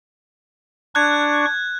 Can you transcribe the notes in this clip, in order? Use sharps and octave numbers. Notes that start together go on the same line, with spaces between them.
D4 C#6 F#6 G#6